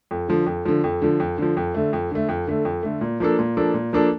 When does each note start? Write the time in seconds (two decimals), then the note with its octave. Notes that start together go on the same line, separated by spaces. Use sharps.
0.11 F2
0.29 D3 F3
0.46 F2
0.65 D3 F3
0.84 F2
1.02 D3 F3
1.20 F2
1.38 D3 F3
1.57 F2
1.75 D3 A3
1.93 F2
2.11 D3 A3
2.29 F2
2.47 D3 A3
2.65 F2
2.83 D3 A3
3.01 A#2
3.20 F3 A#3 D4 A4
3.39 A#2
3.57 F3 A#3 D4 A4
3.74 A#2
3.93 F3 A#3 D4 A4